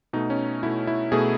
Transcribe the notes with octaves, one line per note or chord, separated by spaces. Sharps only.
B2 A3 D#4
C#4
B2 A3 E4
E4
B2 A3 G#4